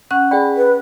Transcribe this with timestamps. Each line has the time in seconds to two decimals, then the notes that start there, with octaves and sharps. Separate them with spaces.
0.11 C#4 F#5 F#6
0.31 G#4 D5 G5 B5
0.57 B4